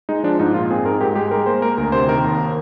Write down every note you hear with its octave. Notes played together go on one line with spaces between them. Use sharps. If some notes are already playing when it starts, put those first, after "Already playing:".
G#3 D#4
F3 D4
G#2 D#4
A#2 F4
C4 G#4
G#2 A#4
G#2 G4
G#3 G4
G#3 A#4
A#3 C5
A#3 A#4
D2 A#4
C3 C5
D#3 A#4
D#2